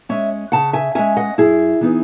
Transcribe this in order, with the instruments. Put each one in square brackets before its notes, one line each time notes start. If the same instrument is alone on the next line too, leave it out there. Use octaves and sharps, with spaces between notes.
[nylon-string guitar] G#3 C#4 C#5 E5
C#3 F#5 A5
E5 G#5
G#3 C#4 E5 G#5
D#5 F#5
F#2 E4 G#4
E3 B3 D#4